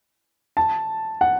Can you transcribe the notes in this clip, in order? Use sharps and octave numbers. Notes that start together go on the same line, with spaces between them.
A5
F#5